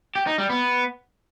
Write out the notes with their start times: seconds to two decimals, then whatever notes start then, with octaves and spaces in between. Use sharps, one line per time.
0.15 G4
0.27 D#4
0.38 G3
0.50 B3